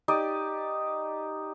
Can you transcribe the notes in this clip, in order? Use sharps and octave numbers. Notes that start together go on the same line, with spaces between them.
D#4 G4 D5 D#5